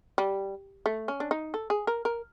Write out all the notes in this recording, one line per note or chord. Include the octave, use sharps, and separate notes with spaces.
G3
A3
C#4
D4
D#4
A4
G#4
A#4
A#4